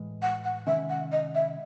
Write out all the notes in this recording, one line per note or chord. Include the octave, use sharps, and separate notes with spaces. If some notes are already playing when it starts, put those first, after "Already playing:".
Already playing: A2 E3 G#3
F#5
F#5
C3 D#3 G#3 C#4 E5
F#5
D#5
E5